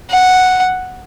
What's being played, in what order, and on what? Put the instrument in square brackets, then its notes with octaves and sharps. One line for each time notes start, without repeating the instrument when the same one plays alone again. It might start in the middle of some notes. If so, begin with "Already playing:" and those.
[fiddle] F#5